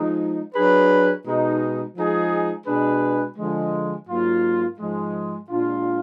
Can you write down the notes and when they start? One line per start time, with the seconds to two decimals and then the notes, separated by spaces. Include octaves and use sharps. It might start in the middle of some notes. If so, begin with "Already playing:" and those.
Already playing: F3 G#3 D#4
0.54 F#3 D4 G#4 B4
1.25 B2 G#3 D#4
1.96 F3 G#3 D#4 G#4
2.66 B2 G#3 D4 G#4 B4
3.38 D3 F3 G#3
4.08 G#2 F#3 A#3 F4
4.79 G#2 F3 G#3
5.49 A#2 G#3 D4 F4